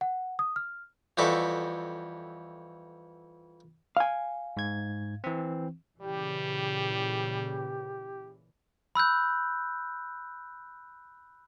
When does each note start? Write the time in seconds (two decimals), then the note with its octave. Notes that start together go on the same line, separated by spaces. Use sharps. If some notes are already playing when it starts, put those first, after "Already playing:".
0.01 F#5
0.39 D#6
0.56 F6
1.17 F2 E3 G3 F#4 A4 E5
3.97 F5 G#5
4.57 G#2 G#6
5.24 E3 C4
6.01 A#2 C#3 E3 G3 G4
8.95 B5 E6 F#6 G6